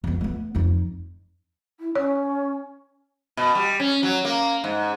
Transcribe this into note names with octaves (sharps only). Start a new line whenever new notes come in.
F2 B3
A3 B3
F2 D#4
E4
C#4 C#5
B2
G3
C#4
F#3
A#3
G#2